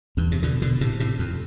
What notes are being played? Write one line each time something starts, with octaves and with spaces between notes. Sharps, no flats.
E2 G2
C3
B2 D3
B2 D3
A2 C3
A2 C3
F2